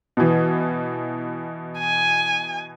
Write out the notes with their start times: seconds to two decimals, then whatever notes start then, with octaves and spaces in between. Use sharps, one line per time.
0.17 B2 E3
1.79 G#5